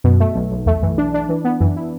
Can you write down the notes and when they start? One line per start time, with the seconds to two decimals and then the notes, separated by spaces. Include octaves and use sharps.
0.04 F#2 B2
0.20 A3
0.35 B1
0.51 B1
0.66 E2 A3
0.82 F#2 E3
0.98 D4
1.14 D4
1.29 E3
1.44 B3
1.60 F#2 E3
1.76 E4